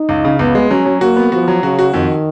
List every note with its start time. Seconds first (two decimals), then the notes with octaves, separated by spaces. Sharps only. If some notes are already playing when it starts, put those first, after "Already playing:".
Already playing: D#4
0.09 C#2
0.25 C#3
0.39 C#2 B3
0.55 G#3
0.70 F#3 C#4
0.86 F#3
1.01 A#3 F#4
1.16 B3
1.32 F3 F#4
1.48 F#3
1.63 C#3 F#4
1.79 F#4
1.94 F2 D#3